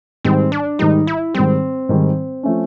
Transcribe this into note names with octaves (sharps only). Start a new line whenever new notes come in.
G#2 D#3 G3 C4
D4
G#2 D#3 G3 D#4
E4
G#2 D#3 G3 C4
G#2 D#3 G3
F3 A3 C#4